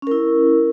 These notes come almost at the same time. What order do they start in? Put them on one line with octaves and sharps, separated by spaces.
C#4 A#4 E4